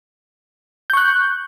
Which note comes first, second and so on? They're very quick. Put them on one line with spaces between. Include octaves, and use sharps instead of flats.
G6 C#6 F#6